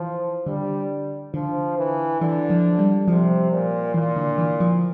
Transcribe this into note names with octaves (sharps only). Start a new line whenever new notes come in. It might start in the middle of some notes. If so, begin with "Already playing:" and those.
Already playing: E3 F3
D3 G3
D3 F3
E3
D3 E3
F3
G3
C3 F3
A#2
A#2 E3
D3
E3
F3